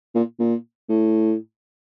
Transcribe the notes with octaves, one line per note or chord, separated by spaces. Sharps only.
A#2
A#2
A2